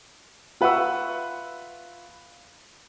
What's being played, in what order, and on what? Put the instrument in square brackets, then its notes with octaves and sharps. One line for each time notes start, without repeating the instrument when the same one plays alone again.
[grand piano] F4 B4 E5 F#5 C#6 E6